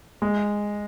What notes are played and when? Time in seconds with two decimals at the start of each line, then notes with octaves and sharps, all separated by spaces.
0.22 G#3